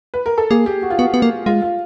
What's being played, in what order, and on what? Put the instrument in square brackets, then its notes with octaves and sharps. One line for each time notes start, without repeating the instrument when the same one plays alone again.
[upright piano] B4
A#4
A4
[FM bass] A#3 [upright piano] G#4
[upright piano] G4
F#4
F4
[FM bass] B3 [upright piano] F#4
[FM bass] B3
A#3
[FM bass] G#3 [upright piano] F4
[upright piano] F4